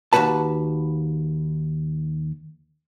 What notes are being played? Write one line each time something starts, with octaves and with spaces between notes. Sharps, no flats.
D#2 F#3 F#4 B4 A5